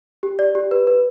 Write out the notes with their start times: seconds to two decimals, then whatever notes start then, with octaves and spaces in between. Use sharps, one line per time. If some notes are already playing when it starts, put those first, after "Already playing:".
0.23 G4
0.39 D5
0.55 G4
0.71 B4
0.87 B4